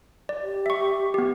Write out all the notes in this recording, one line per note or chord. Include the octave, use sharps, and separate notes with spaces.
D5
G4
E5 C#6
B3 G4